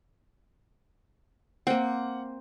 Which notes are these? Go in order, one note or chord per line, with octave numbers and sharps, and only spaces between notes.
A#3 C4 F#5